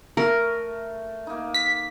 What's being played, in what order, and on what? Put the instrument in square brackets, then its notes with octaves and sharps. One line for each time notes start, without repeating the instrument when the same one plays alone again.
[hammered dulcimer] A3 [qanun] A#4
[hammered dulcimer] A#3 D#4
[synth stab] B6